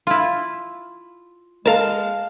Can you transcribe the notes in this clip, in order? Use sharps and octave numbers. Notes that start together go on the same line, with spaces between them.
E4 F4
G#3 A4 A#4 F5 A5